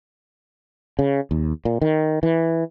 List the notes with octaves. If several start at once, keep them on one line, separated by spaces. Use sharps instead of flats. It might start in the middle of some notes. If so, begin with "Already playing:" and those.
C#3
D#2
A#2
D#3
E3